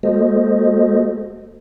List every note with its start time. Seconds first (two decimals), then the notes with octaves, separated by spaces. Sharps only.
0.03 G#3 A#3 F#4 A4 C5 D#5